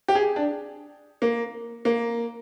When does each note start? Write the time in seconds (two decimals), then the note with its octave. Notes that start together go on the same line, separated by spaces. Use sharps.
0.08 G4
0.15 G#4
0.36 D4
1.22 A#3
1.85 A#3